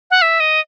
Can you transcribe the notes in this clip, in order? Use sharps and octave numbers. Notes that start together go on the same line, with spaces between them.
F#5
E5
D#5